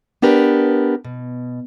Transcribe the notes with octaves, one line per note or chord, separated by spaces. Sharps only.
B3 D4 G4 A#4 B4
B2